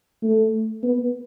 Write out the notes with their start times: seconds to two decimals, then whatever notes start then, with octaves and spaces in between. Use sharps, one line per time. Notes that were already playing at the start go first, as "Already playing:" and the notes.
0.23 A3
0.83 B3